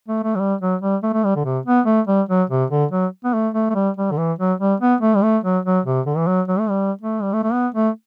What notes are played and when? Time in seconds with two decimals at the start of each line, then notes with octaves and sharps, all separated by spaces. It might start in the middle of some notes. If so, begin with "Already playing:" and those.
0.08 A3
0.23 A3
0.35 F#3
0.40 G3
0.61 F#3
0.81 G3
1.03 A3
1.13 A3
1.24 G3
1.36 D3
1.45 C3
1.66 B3
1.86 A3
2.07 G3
2.29 F#3
2.50 C3
2.70 D3
2.91 F#3
3.24 B3
3.34 A3
3.54 A3
3.70 A3
3.75 G3
3.97 G3
4.11 D3
4.18 E3
4.39 F#3
4.60 G3
4.80 B3
5.01 A3
5.16 G3
5.23 A3
5.44 F#3
5.65 F#3
5.86 C3
6.06 D3
6.18 E3
6.27 F#3
6.48 F#3
6.59 A3
6.70 G3
7.01 A3
7.22 G3
7.33 A3
7.43 A3
7.53 B3
7.75 A3